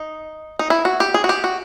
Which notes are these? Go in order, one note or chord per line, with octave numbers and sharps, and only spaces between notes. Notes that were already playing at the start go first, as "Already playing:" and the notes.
Already playing: D#4
D#4
E4
F#4
G4
G#4
F#4
G4
F#4